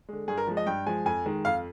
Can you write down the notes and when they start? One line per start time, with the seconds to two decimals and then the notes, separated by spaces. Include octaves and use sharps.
0.08 D3 G#3
0.28 G2 G#4
0.38 A#4
0.47 F3 G#3
0.57 D#5
0.66 G2 G5
0.86 F3 G#3 G#5
1.05 F2 G#5
1.26 D#3 G#3
1.45 F2 F5